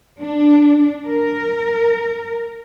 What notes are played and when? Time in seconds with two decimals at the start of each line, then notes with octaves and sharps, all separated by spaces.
0.20 D4
1.08 A#4